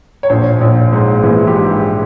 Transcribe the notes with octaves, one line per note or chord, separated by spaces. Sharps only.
C#5
A#1 C5
A#1 C#5
G#2 C5
E3 G#4
G4
G#2